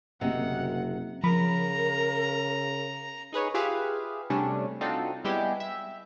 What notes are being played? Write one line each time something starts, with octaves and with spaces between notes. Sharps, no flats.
F#1 D2 C3 A#3 D#5 F#5
C#3 F3 A#4 A#5 B5
D#4 G#4 B4 C#5
F4 G4 G#4 B4 E5 F5
C3 G3 A3 C#4 D4
C4 D4 D#4 F4 F#4 A4
G3 G#3 B3 E4 G4
E5